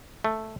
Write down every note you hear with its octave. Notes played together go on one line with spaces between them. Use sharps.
A3